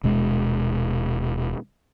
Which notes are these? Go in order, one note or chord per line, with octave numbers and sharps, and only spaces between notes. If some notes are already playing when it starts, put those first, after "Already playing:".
D#1 B2 G#3